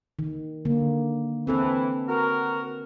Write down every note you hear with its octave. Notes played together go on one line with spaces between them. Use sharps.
D#3
D3 A#3
E3 C4 A4 B4
F#4 A#4